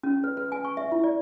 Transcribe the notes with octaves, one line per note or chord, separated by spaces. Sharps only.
C#4
B4
B4
G#5
C#6
E5
E4
D5